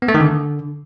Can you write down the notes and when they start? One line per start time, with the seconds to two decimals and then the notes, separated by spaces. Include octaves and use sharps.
0.02 B3
0.08 A3
0.15 D#3
0.21 D3